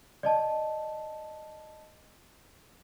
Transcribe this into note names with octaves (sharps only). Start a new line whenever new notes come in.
D5 D#5 A5